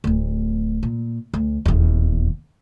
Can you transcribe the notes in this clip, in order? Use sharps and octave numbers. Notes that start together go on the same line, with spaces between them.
D1 D2
A#2
D2
D#1 E2